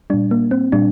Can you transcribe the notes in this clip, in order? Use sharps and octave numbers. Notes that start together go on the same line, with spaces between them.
A#2 G3 D4
A#3
C4
A#2 G3 D4